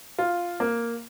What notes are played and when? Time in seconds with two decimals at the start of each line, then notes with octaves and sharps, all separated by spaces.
0.18 F4
0.60 A#3